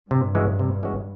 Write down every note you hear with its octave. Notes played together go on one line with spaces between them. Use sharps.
G2 C3
E3 G#3 C#4 F#4
C3
E3 G#3 C#4 F#4